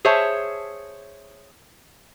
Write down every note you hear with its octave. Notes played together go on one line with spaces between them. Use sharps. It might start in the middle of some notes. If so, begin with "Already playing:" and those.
G#4 C5 C#5 E5 A5